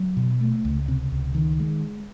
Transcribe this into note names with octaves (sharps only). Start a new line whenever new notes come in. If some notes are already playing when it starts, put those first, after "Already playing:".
Already playing: F#3
B2
A3
C#2
C3
C#2
D#3
G#3